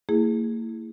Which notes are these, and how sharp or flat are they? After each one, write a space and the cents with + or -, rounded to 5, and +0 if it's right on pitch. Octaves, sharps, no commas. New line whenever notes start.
A#3 -40 E4 +0 G#4 +0